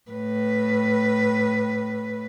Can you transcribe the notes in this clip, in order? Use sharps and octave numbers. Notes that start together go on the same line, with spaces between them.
A2 B4